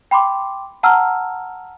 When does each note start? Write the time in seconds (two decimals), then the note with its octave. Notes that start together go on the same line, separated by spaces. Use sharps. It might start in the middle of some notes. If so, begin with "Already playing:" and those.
0.11 G5 B5 C6 D6
0.83 F#5 A5 A#5 E6 F6